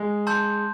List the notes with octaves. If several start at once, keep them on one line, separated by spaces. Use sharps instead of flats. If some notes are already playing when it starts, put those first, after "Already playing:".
Already playing: G#3
A5 C6 E6 G6